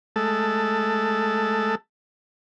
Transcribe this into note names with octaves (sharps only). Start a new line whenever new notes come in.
G#3 A3 A4 A5